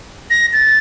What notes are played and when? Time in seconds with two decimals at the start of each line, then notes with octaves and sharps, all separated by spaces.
0.30 A#6
0.53 A6